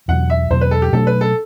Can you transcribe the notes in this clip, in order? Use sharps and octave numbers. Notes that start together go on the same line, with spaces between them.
E2 B2 F#3 F#5
E5
E2 B2 F#3 C5
B4
A4
G4
B2 F#3 A3 D4 A4
B4
A4